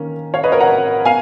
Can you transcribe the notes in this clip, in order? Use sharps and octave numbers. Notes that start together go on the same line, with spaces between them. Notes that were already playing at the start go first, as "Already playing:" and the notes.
Already playing: D#3 A#3 C#4
C#5 F5
B4 D#5
A#4 C#5
F#5 A#5
B3 F5 G#5